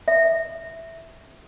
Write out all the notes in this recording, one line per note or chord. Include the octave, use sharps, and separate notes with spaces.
E5